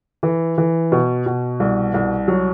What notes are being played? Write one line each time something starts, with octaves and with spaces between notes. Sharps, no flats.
E3
E3
B2
B2
C2
C2
F#3